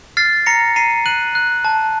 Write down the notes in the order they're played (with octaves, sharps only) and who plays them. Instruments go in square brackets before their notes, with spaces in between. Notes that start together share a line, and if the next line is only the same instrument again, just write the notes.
[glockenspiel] F6 A6 C7
A#5 A#6 C#7
A#5 C7 D#7
F#6 D#7 F#7
F#6
A5